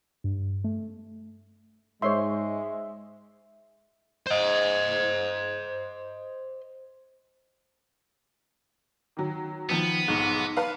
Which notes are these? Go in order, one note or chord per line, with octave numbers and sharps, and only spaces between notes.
G2
A3
G#2 G#3 C5 C#5 E5 C6
C5 D#5
D#3 F#3
D#3 F3 B3
B1 G#2
B4 F5